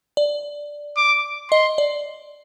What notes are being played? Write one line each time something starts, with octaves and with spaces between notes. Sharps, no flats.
D5
D6
D#5 C6
D5